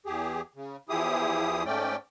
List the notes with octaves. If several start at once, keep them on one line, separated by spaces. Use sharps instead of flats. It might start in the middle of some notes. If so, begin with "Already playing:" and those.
E2 G4 G#4
C#3
E2 F3 E4 G4 G#4 D#6
G#2 A3 C#4 D5 G5